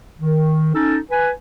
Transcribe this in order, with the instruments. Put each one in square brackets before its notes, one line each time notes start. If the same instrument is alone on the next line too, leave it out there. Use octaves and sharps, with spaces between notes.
[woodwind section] D#3
C#4 D#4 A4
B4 G#5